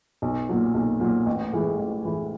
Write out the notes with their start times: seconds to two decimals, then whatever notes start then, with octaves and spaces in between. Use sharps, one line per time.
0.22 B1
0.49 A#2 F#3
0.74 B1
1.00 A#2 F#3
1.26 A1
1.52 A2 E3 G#3
1.79 A1
2.05 A2 E3 G#3